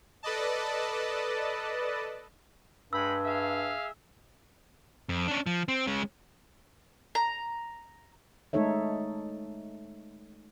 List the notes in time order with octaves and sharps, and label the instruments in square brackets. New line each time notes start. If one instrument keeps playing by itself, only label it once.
[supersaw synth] A4 B4 D5 D#5 A5
[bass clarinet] G2 [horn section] G#3 G5 B5 [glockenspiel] E6
[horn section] G#4 E5 F5
[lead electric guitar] F2
C#4 D4
F3
C4
G#3 C#4
[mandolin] A#5
[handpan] G#3 A3 D#4 A4 C#5 E5